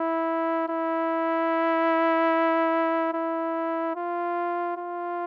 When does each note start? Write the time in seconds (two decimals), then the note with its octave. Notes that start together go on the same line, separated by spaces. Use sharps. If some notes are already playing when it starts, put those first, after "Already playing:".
Already playing: E4
0.68 E4
3.14 E4
3.96 F4
4.77 F4